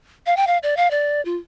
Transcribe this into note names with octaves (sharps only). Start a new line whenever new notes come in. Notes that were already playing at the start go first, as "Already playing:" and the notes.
F5
G5
F5
D5
F5
D5
F4